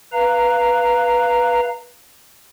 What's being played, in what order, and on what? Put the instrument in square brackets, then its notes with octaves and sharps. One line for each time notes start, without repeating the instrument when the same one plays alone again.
[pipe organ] B4 F5 A#5